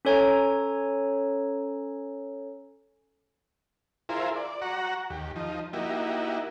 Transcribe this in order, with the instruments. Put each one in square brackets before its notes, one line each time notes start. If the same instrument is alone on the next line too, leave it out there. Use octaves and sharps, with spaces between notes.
[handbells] C#4 A4 C#5 G#5 A#5 G#6
[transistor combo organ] E4 F4 G#4 A#4 C5
D5
F#4 F#5 A#5 C#6
D#2 G4
F3 D#4
A#3 D#4 E4 F#4 G4